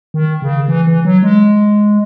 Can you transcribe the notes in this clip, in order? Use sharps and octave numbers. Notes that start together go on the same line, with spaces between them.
D#3
C#3
E3
E3
F#3
G#3